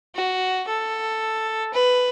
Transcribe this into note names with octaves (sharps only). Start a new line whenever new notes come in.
F#4
A4
B4